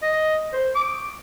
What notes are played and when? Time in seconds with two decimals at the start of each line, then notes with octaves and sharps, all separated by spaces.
0.02 D#5
0.53 C5
0.75 D6